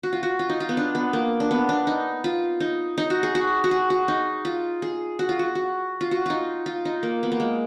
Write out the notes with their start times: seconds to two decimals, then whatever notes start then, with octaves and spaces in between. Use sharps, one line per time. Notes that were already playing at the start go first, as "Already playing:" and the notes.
0.03 F#4
0.13 F4
0.23 F#4
0.39 F4
0.49 D#4
0.60 F4
0.69 B3
0.77 D4
0.95 B3
1.13 A#3
1.40 D4
1.51 B3
1.69 D4
1.87 D#4
2.24 F4
2.60 D#4
2.98 D#4
3.10 F#4
3.23 G#4
3.35 F#4
3.64 F#4
3.71 G#4
3.90 F#4
4.08 D#4
4.45 F4
4.82 G#4
5.19 F#4
5.29 F4
5.39 F#4
5.55 F#4
6.01 F4
6.11 F#4
6.26 D#4 F4
6.66 F4
6.85 D#4
7.03 A#3
7.23 B3
7.32 A#3
7.40 G#3